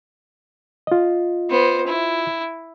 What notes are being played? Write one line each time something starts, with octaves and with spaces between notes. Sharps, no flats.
F4 D#5
B3 C5
E4